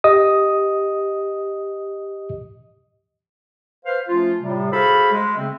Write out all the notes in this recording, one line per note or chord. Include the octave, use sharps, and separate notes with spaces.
G4 D#5 D#6
B4 C5 F5
F3 A3 C#4 F4
A2 C3 G3
F#4 G#4 A4 C5 F5 B5
G#3
C#3 A3 C4